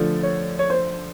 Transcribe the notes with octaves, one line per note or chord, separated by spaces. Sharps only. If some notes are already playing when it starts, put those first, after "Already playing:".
Already playing: D3 F3 A3
C#5
C#5
C5